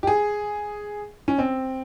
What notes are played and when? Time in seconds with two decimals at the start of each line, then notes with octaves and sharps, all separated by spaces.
0.03 G4
0.07 G#4
1.28 C#4
1.38 C4